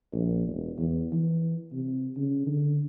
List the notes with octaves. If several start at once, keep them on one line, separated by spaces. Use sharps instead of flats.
A#1
E1
E2
E3
C3
C#3
D3